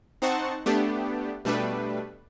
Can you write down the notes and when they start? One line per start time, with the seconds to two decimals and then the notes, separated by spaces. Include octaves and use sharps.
0.22 C4 D#4 C5 F#5 A5 C#6
0.66 A3 B3 D4 G4
1.45 B2 G3 A3 D4 B4